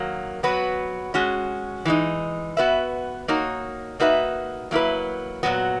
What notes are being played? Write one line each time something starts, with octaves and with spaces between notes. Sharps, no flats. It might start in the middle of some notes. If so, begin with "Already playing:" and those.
Already playing: D#3 F#3 A#3
F#3 B3 F#4 B4
G#3 C#4 F#4
E3 G#3 D#4
B3 F#4 B4 E5
A#3 D#4 F#4 C#5
A#3 D#4 F#4 B4 E5
F#3 A#3 E4 B4
A#2 F#3 B3 F#4